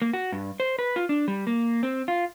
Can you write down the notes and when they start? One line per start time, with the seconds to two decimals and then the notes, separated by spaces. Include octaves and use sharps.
0.02 A#3
0.14 F#4
0.32 G2
0.60 C5
0.79 B4
0.96 F4
1.09 D4
1.28 G3
1.47 A#3
1.83 C4
2.08 F4